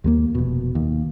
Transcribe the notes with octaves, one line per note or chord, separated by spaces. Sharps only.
D#2 G#3 A#3
F1 B2
D#2